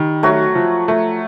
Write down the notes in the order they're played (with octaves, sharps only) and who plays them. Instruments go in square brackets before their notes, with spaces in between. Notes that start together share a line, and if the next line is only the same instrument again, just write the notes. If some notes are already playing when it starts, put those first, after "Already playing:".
Already playing: [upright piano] D#3 [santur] G3
[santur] F#3 F#4 [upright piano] A3
[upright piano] F3
A3